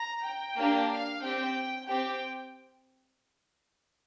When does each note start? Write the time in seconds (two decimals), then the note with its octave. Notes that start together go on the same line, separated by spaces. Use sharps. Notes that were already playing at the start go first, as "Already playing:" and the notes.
Already playing: A#5
0.23 G5
0.57 A#3 D4 G4
0.90 F5
1.22 C4 G4 G5
1.87 C4 G4 G5